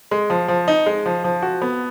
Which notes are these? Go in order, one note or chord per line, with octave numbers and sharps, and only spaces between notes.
G#3
F3
F3
D#4
G#3
F3
F3
F#4
B3